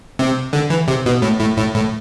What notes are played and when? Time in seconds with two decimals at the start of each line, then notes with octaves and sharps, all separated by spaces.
0.19 C3
0.53 D3
0.70 E3
0.88 C3
1.06 B2
1.22 A2
1.40 A2
1.57 A2
1.74 A2